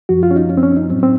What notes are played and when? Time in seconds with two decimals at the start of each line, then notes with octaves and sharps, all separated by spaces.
0.09 F#2 F3 F#4
0.23 F4
0.31 C#4
0.36 D#4
0.50 C#4
0.57 C4
0.63 C#4
0.77 D#4
0.90 A2 F#3 C4
1.03 C4